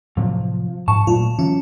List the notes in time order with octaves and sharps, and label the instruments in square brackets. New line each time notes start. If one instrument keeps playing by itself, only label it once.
[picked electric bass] A2 C3 F#3 [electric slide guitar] F3
[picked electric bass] G#2 [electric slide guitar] A5 [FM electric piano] C#6
[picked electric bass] A#2 F#3 A3 [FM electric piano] F4
[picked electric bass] E3 F#3 [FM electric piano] C#4